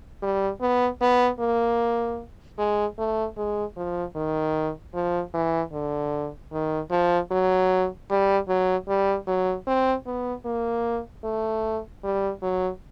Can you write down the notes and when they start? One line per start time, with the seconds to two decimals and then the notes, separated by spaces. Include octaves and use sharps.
0.22 G3
0.61 B3
1.01 B3
1.40 A#3
2.58 G#3
2.98 A3
3.37 G#3
3.77 F3
4.16 D#3
4.94 F3
5.34 E3
5.73 D3
6.53 D#3
6.91 F3
7.31 F#3
8.10 G3
8.49 F#3
8.88 G3
9.27 F#3
9.67 C4
10.06 B3
10.45 A#3
11.24 A3
12.04 G3
12.42 F#3